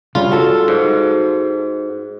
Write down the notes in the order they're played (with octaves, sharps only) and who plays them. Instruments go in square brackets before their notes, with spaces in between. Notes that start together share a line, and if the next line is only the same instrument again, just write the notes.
[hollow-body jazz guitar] C#3 G3 C#4 [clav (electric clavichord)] F4
[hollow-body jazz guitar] F#4 A4
[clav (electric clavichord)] G#2